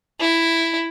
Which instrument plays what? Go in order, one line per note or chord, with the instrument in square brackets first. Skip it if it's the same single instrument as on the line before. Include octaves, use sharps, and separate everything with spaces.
[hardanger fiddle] E4